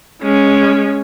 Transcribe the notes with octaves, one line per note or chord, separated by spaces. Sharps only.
G#3 C#4